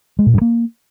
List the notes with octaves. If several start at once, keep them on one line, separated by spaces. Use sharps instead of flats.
G#3
A#2
G2
A#3